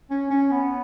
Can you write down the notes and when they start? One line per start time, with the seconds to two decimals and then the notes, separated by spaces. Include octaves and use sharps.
0.11 C#4
0.31 C#4
0.51 B3